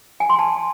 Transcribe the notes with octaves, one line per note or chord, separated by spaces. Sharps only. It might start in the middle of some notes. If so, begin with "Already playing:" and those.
G#5
C6
A5